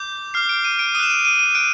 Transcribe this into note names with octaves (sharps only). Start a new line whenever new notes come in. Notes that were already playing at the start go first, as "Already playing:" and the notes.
Already playing: D6 G6
D6 F6 C7
D7
D#7
D7
D#6 F#6 D#7 E7
D#7
D#7
D#7
F#6 D7